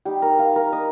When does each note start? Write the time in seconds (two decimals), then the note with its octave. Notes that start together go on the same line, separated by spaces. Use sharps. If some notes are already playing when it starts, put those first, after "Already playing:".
0.05 G3 D#4 G4
0.22 A#4
0.39 F5
0.56 A#4
0.73 D#5